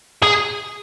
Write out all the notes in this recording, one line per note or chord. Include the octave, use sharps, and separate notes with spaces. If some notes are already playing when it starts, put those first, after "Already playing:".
G#4